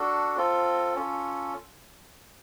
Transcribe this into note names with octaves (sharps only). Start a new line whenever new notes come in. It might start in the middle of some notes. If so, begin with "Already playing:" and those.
Already playing: D4 F#4 A4
C4 F4 A4
C#4 F4 A4